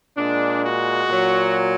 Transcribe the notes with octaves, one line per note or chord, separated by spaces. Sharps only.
A#2 G#3 D4
F#4
A#2 F#3